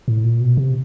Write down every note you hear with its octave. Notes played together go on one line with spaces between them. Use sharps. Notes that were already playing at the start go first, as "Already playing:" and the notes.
A2
A#2
B2
C3